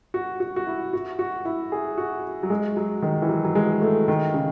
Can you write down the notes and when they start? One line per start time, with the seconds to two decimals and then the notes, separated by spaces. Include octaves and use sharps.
0.14 F#4
0.40 F#4
0.56 F#4
0.67 E4
0.93 F#4
1.19 F#4
1.45 E4
1.72 G#4
1.98 F#4
2.43 F#3
2.50 G#3
2.77 F#3
3.02 D#3
3.22 E3
3.29 F#3
3.44 F#3
3.55 G#3
3.82 A3
4.08 D#3
4.34 C#3